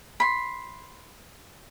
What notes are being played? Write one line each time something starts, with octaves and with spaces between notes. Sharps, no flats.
B5 C6